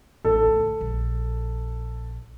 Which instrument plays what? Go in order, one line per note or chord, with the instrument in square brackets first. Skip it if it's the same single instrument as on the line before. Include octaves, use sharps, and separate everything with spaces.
[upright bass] A1 [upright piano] A4
[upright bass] D2
A#1